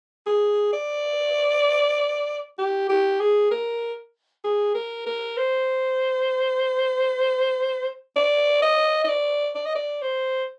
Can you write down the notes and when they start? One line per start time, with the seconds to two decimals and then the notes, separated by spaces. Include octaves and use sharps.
0.26 G#4
0.73 D5
2.58 G4
2.89 G4
3.20 G#4
3.51 A#4
4.44 G#4
4.75 A#4
5.06 A#4
5.37 C5
8.16 D5
8.62 D#5
9.04 D#5
9.09 D5
9.55 D5
9.66 D#5
9.75 D5
10.02 C5